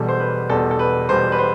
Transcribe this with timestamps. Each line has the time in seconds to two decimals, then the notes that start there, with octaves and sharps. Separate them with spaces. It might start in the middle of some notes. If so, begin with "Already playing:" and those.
Already playing: E1 E2 B2 G3 A4
0.09 C5
0.20 B4
0.49 E1 E2 B2 G3 A4
0.71 A4
0.79 B4
1.09 E1 E2 B2 G3 C5
1.32 B4
1.38 C5